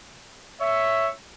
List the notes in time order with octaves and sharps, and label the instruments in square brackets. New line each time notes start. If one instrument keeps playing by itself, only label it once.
[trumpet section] C#5 E5